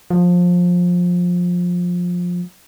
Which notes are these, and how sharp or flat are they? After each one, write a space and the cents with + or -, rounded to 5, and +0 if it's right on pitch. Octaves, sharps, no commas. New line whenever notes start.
F3 +20